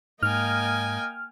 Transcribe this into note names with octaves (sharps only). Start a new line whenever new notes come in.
G#2 A#3 D#5 G5 G#5 F6